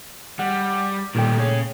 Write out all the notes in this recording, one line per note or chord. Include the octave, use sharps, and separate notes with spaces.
G3 F#5
A#2 D#3 G3 A3 G5
C#3 C#4